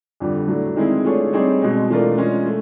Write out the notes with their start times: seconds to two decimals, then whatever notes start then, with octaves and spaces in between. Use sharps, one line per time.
0.20 F2 D3 G3
0.48 A2 F#3 A3 D4
0.76 D#3 G#3 C4 E4 G#4
1.04 A3 D4 F4 G#4 C#5
1.33 G3 C4 D#4 G#4 C#5
1.62 B2 G#3 C4
1.90 E3 A3 D4 F4 A#4
2.17 G#3 C#4 F4
2.45 A3